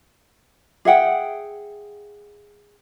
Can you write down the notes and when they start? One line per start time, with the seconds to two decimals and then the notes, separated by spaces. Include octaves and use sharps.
0.85 G#4 E5 F#5 G5